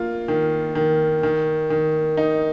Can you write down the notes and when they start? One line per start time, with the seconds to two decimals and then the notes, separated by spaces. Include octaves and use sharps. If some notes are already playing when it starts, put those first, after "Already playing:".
Already playing: A#3 F4
0.28 D#3
0.75 D#3
1.23 D#3
1.70 D#3
2.17 D#4